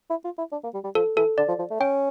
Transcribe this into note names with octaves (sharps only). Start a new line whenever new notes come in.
E4
F4
E4
D4
A#3
G3
G3
F3 A4
E3 A4
D3 D5
F3
F3
A3
C#4 G5